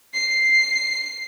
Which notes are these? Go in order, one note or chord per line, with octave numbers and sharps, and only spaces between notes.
C7